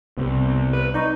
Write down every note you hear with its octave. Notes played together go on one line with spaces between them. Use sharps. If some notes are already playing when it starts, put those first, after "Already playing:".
C2 C3 B3
B4
D#4 D5 A#5 C#6